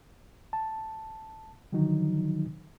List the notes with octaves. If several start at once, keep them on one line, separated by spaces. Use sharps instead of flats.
A5
D3 D#3 F3 F#3 D#4